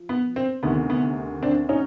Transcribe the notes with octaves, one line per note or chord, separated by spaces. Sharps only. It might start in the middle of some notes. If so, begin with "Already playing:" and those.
Already playing: F3
B3
C4
D2 C3 D#3 B3
B3
C4 D4
C#4 D#4